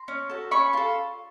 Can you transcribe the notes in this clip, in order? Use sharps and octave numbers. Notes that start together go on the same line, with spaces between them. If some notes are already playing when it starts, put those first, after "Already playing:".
Already playing: A#5 C6
C#4
F#4 A4
C#4 B5 C#6
F4 A4